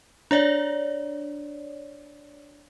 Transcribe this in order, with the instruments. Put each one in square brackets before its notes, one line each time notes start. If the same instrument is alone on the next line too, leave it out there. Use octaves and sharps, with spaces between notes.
[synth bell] D4 C#5 D5